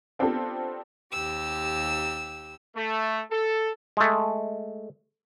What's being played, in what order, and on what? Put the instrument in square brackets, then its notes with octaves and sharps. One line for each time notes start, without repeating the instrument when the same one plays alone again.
[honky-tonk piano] B3 C4 D4 F4 G4 A4
[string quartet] D#2 G4 E6
[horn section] A3
A4
[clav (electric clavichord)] G#3 A3